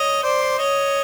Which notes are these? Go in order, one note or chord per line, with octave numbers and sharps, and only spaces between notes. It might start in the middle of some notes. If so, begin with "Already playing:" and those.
Already playing: C#5 D#5
C5 D5
C#5 D#5